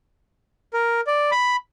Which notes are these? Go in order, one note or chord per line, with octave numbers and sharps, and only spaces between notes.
A#4
D5
B5